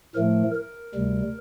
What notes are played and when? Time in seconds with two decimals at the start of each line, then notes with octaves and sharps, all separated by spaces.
0.15 A2 F3 A3 A#4
0.55 A#4
0.95 D2 C3 G3